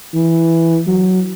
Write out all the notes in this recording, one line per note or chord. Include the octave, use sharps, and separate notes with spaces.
E3
F#3